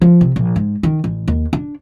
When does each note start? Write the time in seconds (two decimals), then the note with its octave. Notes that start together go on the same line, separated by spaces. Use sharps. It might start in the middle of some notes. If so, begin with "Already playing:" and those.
0.02 F3
0.21 C3
0.36 A#1
0.56 G#2
0.83 D#3
1.04 A1
1.28 D#2
1.53 D4